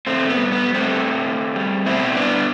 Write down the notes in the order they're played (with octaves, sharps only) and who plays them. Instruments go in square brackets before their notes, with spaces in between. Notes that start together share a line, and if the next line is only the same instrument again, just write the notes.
[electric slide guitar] A2 A3 C4
B3
G3
B3
G3
A3 C4
A2
A2
G3
B2 C4 E4
G3 B3 D4